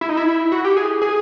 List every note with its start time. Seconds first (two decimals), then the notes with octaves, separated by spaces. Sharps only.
0.01 E4
0.09 D#4
0.17 E4
0.52 F#4
0.64 G4
0.77 G#4
1.02 G#4